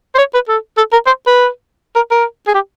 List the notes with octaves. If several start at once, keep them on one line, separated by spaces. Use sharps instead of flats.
C5
C#5
B4
A4
A4
A#4
C5
B4
A#4
A#4
G#4
G4